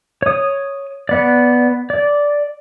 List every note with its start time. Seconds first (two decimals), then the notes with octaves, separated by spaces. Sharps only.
0.22 C#5 D#6
1.09 B3 D5
1.90 D5